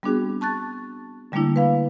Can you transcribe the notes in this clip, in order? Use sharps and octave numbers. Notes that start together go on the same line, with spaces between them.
G3 B3 C4 D4 F#4 G#4
A5 C#6 F#6 A6
D3 G3 A3 A#3 D4 E4
B4 F5 B5